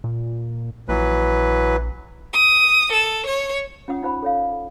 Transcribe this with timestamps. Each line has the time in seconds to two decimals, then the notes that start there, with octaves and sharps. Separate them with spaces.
0.04 A#2
0.89 A#1 E3 F#3 B4
2.32 D#6
2.92 A4
3.26 C#5
3.88 C#4 F4 C#5 F#5 D#6
4.03 D#4 F4 C5 F#5 B5
4.23 A4 C#5 F5
4.52 A4